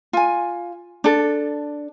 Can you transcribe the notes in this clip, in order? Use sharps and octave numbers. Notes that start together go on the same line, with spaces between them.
F4 G#5
D4 A4